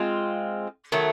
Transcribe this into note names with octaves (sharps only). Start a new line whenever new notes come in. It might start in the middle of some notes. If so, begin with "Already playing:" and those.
Already playing: G#3 C4 F4
D#3 F#3 A3